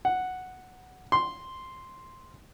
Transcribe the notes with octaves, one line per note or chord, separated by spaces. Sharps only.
F#5
C6